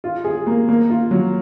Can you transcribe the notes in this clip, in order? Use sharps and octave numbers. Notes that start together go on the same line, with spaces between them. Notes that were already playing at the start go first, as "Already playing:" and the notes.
F4
G#4
A#3
A#3
F4
F#3